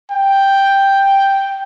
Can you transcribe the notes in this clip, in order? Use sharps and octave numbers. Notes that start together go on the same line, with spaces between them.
G5